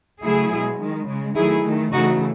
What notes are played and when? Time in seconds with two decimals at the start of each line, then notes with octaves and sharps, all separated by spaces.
0.23 C#3 F#3 A3 E4 G#4
0.51 B2 G#3
0.79 D#3 G#3
1.08 C#3 G#3
1.36 D#3 F#3 A3 E4 G#4
1.64 D#3 A3
1.93 C#3 E3 A3 D#4 F#4